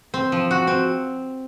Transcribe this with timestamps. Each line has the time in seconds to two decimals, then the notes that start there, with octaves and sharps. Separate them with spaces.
0.14 C4
0.32 F3
0.51 F#4
0.67 C4